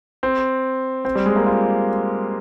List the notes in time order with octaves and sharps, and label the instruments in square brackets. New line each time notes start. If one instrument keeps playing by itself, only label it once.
[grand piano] C4
C4
G3
G#3
A#3
F4